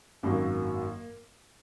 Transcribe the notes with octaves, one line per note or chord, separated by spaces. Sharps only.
G#1 F#2 D#3 F#3 A#3